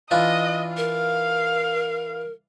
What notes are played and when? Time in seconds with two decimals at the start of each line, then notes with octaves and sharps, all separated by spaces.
0.11 E3 D4 F4 D#5 F#6
0.77 A#4 F5